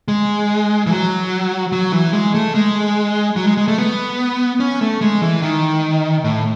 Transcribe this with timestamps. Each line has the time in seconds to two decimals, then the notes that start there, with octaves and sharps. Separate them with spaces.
0.08 G#3
0.87 E3
0.91 F#3
1.72 F#3
1.93 E3
2.13 G#3
2.35 A3
2.55 G#3
3.36 F#3
3.47 G#3
3.57 G#3
3.68 A3
3.78 B3
4.60 C#4
4.81 A3
5.01 G#3
5.22 E3
5.42 D#3
6.24 A2